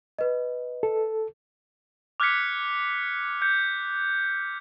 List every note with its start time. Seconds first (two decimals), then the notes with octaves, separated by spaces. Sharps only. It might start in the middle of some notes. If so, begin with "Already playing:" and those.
0.19 B4 D#5
0.83 A4
2.20 D6 F6 F#6 G#6 B6 C#7
3.42 G6 C#7